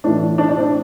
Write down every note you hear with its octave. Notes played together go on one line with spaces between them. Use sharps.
A2 E3 D4
D4
D4
C4
D4